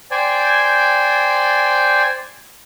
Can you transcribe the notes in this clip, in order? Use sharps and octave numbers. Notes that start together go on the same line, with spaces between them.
C5 D5 G5 G#5